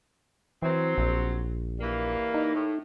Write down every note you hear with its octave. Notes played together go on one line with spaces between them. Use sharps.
E3 F#3 C4
A#1
E3 G3 A#3
D#4
A2